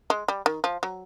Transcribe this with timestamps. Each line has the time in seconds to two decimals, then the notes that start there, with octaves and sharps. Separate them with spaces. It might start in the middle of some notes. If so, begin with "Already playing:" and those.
0.10 G#3
0.28 G3
0.46 D#3
0.64 F3
0.83 F#3